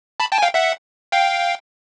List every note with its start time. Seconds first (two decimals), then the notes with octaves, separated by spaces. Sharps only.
0.20 A5 B5
0.32 G5 A5
0.38 G#5
0.43 F5 G5
0.54 E5 F#5
1.12 F5 G5